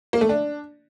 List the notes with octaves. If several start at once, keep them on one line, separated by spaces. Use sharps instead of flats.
A#3
A3
D4